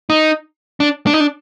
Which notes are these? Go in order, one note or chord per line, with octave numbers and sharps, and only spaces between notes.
D#4
D4
D4
D#4
D4